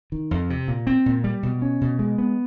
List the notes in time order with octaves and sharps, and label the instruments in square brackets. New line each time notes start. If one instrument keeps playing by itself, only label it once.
[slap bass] D#3
F2
C3
A#2
C4
A#2
G3
B2
C#4
B2
G#3
B3